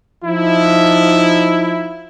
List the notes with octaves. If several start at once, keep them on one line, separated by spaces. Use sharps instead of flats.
F3 D#4 E4